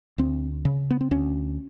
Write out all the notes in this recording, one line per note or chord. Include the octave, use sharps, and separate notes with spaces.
D2 C4
C#3
B3
C4
D2 C#4